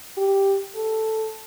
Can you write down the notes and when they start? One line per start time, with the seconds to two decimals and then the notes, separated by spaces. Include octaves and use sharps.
0.18 G4
0.76 A4